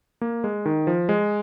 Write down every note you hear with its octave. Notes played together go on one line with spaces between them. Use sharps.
A#3
G#3
D#3
F3
G#3